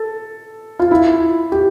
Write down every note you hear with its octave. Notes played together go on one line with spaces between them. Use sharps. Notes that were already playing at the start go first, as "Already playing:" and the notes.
Already playing: A4
F4
E4
G4